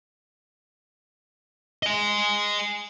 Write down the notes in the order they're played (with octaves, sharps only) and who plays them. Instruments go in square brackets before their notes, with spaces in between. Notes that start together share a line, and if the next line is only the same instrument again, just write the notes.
[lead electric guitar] D#5 G#5